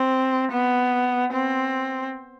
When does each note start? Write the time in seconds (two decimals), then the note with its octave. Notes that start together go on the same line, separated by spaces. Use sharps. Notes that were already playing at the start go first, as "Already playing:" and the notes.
Already playing: C4
0.52 B3
1.32 C4